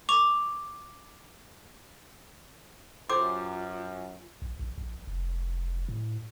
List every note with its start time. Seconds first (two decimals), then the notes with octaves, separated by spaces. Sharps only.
0.09 C#6 D6 F7
3.10 F#2 F4 G4 C5 D6
4.42 A#1
4.59 A#1
4.78 A#1
5.07 F1
5.89 A2